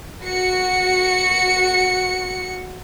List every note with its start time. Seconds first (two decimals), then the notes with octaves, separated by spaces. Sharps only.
0.23 F#4 C#7